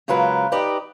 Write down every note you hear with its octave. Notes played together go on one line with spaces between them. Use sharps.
C#3 F#3 G#3 F4 A#4 B4
D#4 G4 B4 D5 D#5